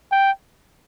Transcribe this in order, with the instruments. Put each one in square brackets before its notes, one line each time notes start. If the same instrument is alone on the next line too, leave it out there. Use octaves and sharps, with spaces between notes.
[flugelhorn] G5